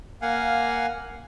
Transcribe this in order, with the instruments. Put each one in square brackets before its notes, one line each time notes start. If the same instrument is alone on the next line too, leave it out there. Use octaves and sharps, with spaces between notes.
[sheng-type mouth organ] A#3 F5 F#5 G#5